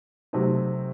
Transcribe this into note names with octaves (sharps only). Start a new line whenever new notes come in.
C3 F#3 A3 C4 D#4